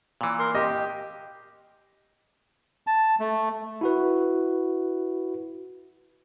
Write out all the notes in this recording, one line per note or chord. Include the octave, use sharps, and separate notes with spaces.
A#2 E3
A#4 C6
G4 D#5
A5
A3
E4 F#4 B4